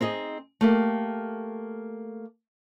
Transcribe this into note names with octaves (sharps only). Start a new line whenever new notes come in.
C4 D#4 G#4 D#5
A3 A#3 G4